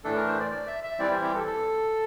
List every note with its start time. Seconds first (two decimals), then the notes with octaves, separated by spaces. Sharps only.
0.04 A2 E3 A3 D4 A4
0.16 A#4
0.28 C5
0.40 D5
0.52 D5
0.67 E5
0.84 E5
0.99 E3 G3 C4 E4 D5
1.11 C5
1.23 G4
1.35 A4
1.47 A4